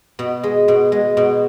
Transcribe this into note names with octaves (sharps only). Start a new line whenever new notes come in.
B2
G#3
B2
G#3
B2